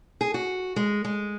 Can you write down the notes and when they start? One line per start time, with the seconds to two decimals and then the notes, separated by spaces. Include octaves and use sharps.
0.21 G#4
0.34 F#4
0.76 G#3
1.04 G#3